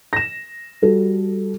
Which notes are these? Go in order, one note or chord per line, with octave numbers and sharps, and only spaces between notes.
A#6 E7
G3 F#4 A4